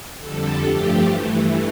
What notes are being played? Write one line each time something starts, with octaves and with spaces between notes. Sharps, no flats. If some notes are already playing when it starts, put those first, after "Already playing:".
F2 D3 G3 A4
G2 F3 A3 G4
G2 E3 A3